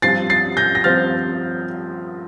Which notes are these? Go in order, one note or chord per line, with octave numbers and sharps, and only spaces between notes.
G2 F3 C4 A6 C7
A6 C7
G6 A#6
A#6
G2 F3 C4 F6 A6